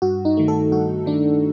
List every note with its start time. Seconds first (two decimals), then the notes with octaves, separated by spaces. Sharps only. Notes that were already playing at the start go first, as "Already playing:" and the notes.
0.02 G2 F#4
0.25 D#4
0.37 D#3 A3
0.48 A4
0.72 G2 F#4
1.06 D#3 A3 D4